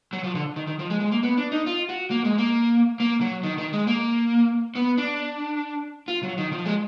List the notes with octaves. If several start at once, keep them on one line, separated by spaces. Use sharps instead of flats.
F#3
F3
D3
D#3
D#3
F3
G#3
G#3
A#3
B3
D4
D#4
F4
F#4
A#3
G#3
A#3
A#3
F#3
D#3
D#3
G#3
A#3
B3
D4
F4
F#3
D#3
F3
G#3